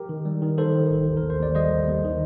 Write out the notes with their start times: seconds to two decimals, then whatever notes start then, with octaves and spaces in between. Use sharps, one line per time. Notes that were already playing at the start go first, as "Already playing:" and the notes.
Already playing: G4 A#4
0.09 D#3
0.25 G3
0.42 D#3
0.58 D#3 A4 C5
0.74 D#3
0.90 A1
1.06 D#2
1.17 A#4
1.23 D#2
1.30 C5
1.39 D#2 D5
1.55 G3 C5 D#5
1.71 G3
1.87 D#2
2.04 D#3